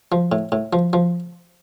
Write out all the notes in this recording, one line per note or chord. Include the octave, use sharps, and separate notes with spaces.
F3
A2
A2
F3
F3